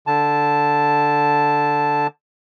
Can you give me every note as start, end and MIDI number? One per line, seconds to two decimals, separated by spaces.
0.07 2.07 50
0.07 2.07 81